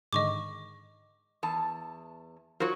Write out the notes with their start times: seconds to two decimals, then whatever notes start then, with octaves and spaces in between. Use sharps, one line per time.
0.13 G#2 D3 D#3 D#5 C#6 D6
1.43 E2 A5
2.60 F#3 F4 F#4 A#4 C5